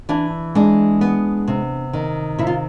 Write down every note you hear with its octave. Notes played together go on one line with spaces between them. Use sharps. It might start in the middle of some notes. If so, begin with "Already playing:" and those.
E3 D4
G#3 D4
B3
C3
D#3
C3 E4
F4